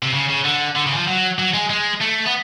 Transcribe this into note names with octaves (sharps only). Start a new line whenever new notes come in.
C3
C#3
C#3
D3
D3
C#3
E3
F3
F#3
F#3
G#3
G#3
A3
B3